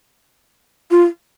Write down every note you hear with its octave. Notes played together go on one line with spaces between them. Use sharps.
F4